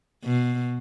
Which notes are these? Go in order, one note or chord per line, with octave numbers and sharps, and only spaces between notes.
B2